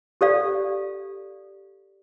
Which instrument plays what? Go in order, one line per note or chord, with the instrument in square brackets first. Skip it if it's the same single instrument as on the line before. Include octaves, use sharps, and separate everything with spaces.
[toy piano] G4 A4 D5 F5